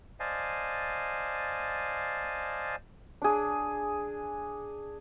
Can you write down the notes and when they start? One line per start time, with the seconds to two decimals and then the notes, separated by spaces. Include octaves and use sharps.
0.20 C5 D5 D#5 F5 G#5 A5
3.22 D4 G#4